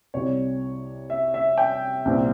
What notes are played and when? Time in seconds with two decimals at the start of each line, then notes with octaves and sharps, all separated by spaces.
0.14 C2 C3 G3 C#5
1.10 E5
1.34 E5
1.58 G5
2.05 C2 A#2 G3 C4